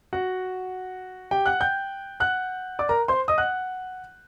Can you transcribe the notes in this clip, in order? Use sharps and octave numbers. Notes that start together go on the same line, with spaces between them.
F#4 F#5
G4 G5
F#5 F#6
G5 G6
F#5 F#6
D5 D6
A#4 A#5
C5 C6
D#5 D#6
F#5 F#6